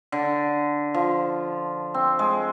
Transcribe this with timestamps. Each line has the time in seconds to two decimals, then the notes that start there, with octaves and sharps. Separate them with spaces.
0.12 D3
0.94 F3
1.94 C4
2.19 G#3